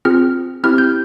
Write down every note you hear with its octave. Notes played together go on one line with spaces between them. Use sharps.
C4 F4 G#4 F6
C4 E4 G4 F6
G6